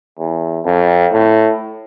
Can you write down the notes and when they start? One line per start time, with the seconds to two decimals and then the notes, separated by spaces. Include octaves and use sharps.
0.18 E2
0.65 F2
1.12 A2